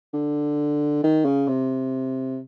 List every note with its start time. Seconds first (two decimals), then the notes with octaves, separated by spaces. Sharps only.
0.14 D3
1.03 D#3
1.25 C#3
1.48 C3